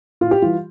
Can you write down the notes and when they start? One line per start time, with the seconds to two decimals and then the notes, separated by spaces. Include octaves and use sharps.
0.21 A2 F4
0.31 G4
0.42 E3 G3 F4